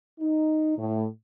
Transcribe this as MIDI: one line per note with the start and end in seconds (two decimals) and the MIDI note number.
0.20 0.74 63
0.78 1.05 45